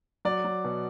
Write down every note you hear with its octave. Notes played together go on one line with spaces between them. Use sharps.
F#3 D5
F#3
B2